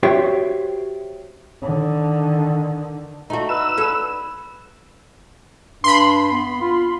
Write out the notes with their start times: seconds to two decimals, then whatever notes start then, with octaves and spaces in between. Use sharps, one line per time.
0.03 F#4 G4 C5 C#5 E5 G5
1.62 D3 D#3
3.30 A3 D#4 F#4
3.49 B4 E6
3.77 C#4 A4
5.84 G2 B5 C6
6.32 B3
6.61 F4